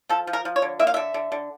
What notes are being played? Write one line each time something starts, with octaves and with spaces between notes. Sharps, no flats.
F3 A4
F3
A#4
F3
C#5
D3
A#3 E5
F5
D3 E5
D3
D3